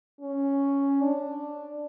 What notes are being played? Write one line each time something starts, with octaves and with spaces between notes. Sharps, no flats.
C#4
D4